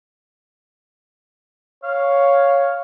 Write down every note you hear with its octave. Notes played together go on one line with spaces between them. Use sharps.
C#5 F5